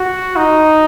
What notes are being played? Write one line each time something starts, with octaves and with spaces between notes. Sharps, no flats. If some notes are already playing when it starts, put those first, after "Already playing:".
Already playing: F#4
D#4